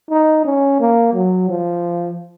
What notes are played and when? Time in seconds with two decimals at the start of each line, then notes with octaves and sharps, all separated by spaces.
0.11 D#4
0.45 C#4
0.80 A#3
1.14 F#3
1.49 F3